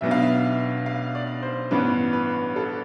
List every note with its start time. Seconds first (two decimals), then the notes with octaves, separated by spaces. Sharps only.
0.01 B1 B2 B3 D4 E5
0.11 F5
0.22 E5
0.86 F5
1.15 D5
1.42 C5
1.71 A1 G2 E3 B3 D4 B4
2.13 B4
2.56 A4